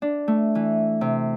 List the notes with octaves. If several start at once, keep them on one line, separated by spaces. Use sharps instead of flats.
D4
A3
E3
C3